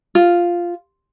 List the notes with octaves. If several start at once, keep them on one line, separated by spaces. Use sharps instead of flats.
F4